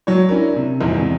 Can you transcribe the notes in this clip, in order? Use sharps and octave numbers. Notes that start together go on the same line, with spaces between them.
F#3 C#5
C#4 D4 E4 A#4
C3
A#1 E2 G#2
E2 C3